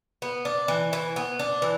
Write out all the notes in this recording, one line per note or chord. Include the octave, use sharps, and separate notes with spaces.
B3
D4
E3
E3
B3
D4
E3